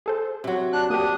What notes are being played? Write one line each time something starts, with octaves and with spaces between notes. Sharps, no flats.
G#4 A4 C5
C3 F#3
D4 F#6
A#3 D4 G4 D#6